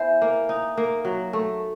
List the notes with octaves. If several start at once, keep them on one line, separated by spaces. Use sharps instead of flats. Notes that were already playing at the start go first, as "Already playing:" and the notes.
Already playing: B3 E4 C5 E5 G#5
A#3
D#4
A#3
F#3
A3